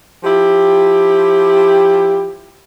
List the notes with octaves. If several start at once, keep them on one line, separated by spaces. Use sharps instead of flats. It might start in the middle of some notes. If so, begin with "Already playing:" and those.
F3 E4 G4